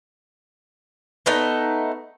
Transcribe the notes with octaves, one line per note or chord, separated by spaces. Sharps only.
A3 B3 D#4